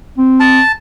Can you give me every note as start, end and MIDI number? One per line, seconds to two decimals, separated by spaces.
0.18 0.60 60
0.40 0.72 81